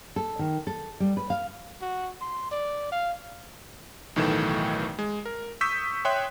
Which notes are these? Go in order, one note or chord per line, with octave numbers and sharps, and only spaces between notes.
A4
D#3
A4
G3
B4
F5
F#4
C6
D5
F5
B1 A2 D#3 E3 A3 E7
G#3
A#4
C#6 D#6 E6 G6 B6
C#5 E5 G5 C6 D#6 F#6